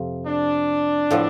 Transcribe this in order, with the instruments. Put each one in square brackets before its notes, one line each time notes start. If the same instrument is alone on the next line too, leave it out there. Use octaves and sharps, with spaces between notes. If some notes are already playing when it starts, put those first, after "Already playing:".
Already playing: [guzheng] F2 C3 F3
[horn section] D4
[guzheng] A2 F3 B3